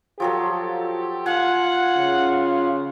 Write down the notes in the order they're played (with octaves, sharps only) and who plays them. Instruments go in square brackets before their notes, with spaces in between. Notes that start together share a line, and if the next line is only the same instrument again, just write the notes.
[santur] F3 F#3 A4 [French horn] G4
[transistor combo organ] F4 [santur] F5 G#5 [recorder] F#5
[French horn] C#3